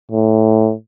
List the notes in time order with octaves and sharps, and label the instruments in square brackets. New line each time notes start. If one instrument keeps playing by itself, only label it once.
[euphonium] A2